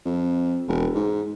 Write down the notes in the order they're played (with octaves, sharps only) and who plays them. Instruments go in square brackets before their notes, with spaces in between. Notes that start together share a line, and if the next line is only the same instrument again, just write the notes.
[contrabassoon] F2
E1
G#2